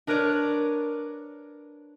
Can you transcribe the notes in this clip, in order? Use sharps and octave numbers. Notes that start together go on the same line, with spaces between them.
D4 A#4 B4 C#5 D5